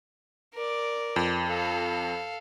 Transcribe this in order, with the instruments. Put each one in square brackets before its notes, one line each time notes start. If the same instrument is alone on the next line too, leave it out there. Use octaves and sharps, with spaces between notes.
[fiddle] A#4 D5
[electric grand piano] F2
[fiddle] A4 F5